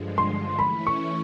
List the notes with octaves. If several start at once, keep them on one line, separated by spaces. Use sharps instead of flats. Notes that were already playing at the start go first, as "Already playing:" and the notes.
Already playing: G2 D3 F3 G#3
C6
E3 A3 C#4 E4 B5
C#6